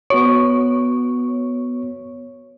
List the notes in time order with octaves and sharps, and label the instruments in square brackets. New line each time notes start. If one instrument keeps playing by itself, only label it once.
[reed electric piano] B3 F#4 C#6 [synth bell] C#5